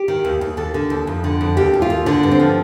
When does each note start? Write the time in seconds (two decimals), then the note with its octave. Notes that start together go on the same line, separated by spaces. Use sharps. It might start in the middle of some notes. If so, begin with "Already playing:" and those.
Already playing: G4
0.08 D#3
0.25 D#2
0.41 D#2
0.57 D#2 A4
0.74 D3
0.90 D#2
1.07 F2
1.24 D3
1.41 F2
1.57 D#2 G4
1.73 D#2
1.82 F4
1.90 D#2
2.06 D3 D4
2.23 G2
2.31 C4
2.40 F3